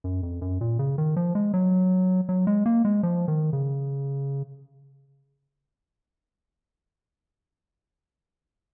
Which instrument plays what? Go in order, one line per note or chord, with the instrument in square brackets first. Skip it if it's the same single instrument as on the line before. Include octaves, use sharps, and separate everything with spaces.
[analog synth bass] F#2
F2
F#2
A#2
C#3
D#3
F3
G#3
F#3
F#3
G#3
A#3
G#3
F3
D#3
C#3